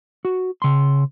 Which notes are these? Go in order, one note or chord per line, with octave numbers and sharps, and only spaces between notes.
F#4
C#3 C6